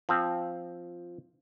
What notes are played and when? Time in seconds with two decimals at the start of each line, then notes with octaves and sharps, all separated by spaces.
0.09 F3 C4